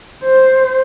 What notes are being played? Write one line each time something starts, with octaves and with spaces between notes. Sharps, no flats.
C5